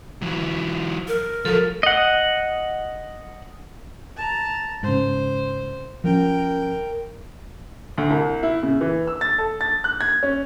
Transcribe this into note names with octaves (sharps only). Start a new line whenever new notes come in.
E3 F#3
A#4
F3 F#3 A4
D#5 F#5
A5 A#5
G#2 C#3 C5
F3 C4 C#4 A#4 G5
D2
C2
E4
C#3
E3
E6
A6
A4
A6
F#6
G#6
C#4